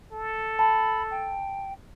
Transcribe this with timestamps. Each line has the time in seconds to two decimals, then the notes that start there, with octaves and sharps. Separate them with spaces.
0.13 A4
0.59 A5 B5
1.11 G5